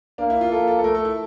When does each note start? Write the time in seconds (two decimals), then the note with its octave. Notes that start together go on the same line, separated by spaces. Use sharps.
0.18 A#3 D4
0.30 E4
0.41 F4
0.52 A#3 A4
0.68 A4
0.79 A4
0.83 A3 A#4
0.95 A4
1.05 E4